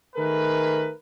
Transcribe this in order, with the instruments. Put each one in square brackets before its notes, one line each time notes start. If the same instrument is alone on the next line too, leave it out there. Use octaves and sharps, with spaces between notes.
[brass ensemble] D#3 A3 G#4 A#4 B4